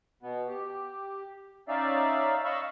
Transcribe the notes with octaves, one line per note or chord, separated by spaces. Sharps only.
B2 B3
G4
C#4 D#4 D5 E5 F5
D#5 F5 B5 C#6 E6